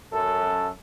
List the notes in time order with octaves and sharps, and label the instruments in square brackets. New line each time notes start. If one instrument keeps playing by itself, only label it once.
[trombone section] F#2 A4